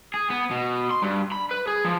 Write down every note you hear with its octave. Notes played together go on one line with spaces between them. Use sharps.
G#4
B3
B2
C6
G2
B5
B4
G#4
F3